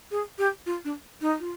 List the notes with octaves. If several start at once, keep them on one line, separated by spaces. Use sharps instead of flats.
G#4
G4
F4
D4
D#4
F4